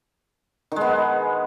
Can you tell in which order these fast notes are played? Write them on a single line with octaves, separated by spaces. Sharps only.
D#3 G#3 B3